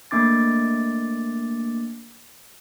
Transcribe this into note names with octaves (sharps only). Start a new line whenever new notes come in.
A3 A#3 D4 D6 A6